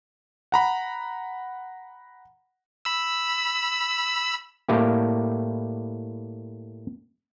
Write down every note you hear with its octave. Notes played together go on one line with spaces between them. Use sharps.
F#5 A#5 B5
B5 E6
A2 G3 A#3 E4 G4